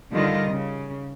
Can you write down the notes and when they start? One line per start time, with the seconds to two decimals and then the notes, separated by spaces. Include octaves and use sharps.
0.12 D3 D#3 G3 F4 D#5
0.49 C#3